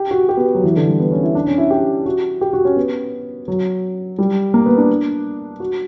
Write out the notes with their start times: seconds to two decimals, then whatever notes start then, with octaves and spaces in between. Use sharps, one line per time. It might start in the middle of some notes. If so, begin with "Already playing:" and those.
Already playing: G4
0.11 F#4
0.29 G4
0.37 B3
0.55 F#3
0.64 E3
0.76 D3
0.88 G3
1.00 B3
1.11 C#4
1.23 E4
1.35 D4
1.47 C#4
1.58 E4
1.71 G4
2.06 F#4
2.41 G4
2.53 F#4
2.65 C#4
2.76 B3
3.48 F#3
4.19 G3
4.54 A#3
4.66 B3
4.78 D4
5.60 F#4